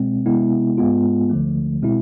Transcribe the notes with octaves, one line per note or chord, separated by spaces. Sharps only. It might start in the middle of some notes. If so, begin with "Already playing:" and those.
Already playing: B2 G#3 C4
C3 G#3 B3 E4
G#2 G#3 B3 F4
D2 D3 F3 A3
B2 G#3 C4 E4